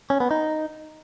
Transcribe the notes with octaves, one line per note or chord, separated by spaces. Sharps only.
C#4
B3
D#4